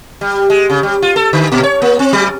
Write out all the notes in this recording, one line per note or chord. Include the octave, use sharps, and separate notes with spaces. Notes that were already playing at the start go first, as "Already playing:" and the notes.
G3
G#3
C#3
G3
F4
A4
D3
A#2
C#5
A#3
C4
F#3